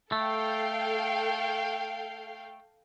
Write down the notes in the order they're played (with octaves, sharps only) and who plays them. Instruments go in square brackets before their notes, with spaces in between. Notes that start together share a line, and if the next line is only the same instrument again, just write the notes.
[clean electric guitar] A3 [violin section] A4 F5 G5